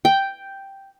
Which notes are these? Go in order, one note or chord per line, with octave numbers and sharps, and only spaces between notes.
G5